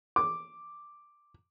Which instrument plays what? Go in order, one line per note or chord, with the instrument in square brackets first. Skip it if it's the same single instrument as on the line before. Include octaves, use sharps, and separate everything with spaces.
[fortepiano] D6